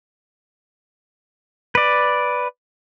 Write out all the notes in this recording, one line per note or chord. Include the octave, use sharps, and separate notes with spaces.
B4 D5